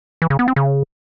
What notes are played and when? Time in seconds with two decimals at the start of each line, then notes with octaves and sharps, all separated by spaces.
0.22 E3
0.30 C#3
0.39 B3
0.48 C4
0.56 C#3